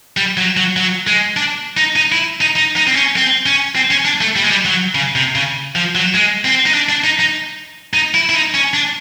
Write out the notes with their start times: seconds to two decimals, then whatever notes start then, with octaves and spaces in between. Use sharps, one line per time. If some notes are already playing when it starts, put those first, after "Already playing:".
0.17 G3
0.37 F#3
0.57 F#3
0.76 F#3
1.07 G#3
1.37 D4
1.77 D#4
1.96 D#4
2.12 E4
2.41 D#4
2.56 D#4
2.76 D#4
2.87 C4
2.96 C#4
3.16 C4
3.46 C#4
3.75 C4
3.91 C#4
4.05 D4
4.21 A3
4.36 G3
4.43 G#3
4.51 G3
4.65 F#3
4.95 C#3
5.16 C3
5.35 C#3
5.75 F3
5.95 F#3
6.14 G#3
6.45 C4
6.66 D#4
6.74 D4
6.89 D4
7.04 D#4
7.19 D#4
7.94 D#4
8.14 E4
8.29 E4
8.34 D#4
8.54 C#4
8.74 D4